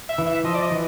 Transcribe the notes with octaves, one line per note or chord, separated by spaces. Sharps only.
E5
E3
E5
F3 D#5
D5
D#5
E3